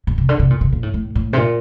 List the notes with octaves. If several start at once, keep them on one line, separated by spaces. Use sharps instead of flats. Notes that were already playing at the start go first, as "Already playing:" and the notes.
A#2
C3
D3
C3
A#2
C3
A#2
A2
A2
A2
C3
A#2